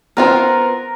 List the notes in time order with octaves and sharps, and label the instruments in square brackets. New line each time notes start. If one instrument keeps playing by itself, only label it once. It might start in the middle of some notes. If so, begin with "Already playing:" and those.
[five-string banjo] B3 C4 F4 [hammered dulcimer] A#4